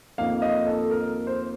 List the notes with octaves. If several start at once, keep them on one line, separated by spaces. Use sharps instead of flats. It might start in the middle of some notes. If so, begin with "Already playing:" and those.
F2 D#3 A#3 F5
D#5
A4
A#4
C5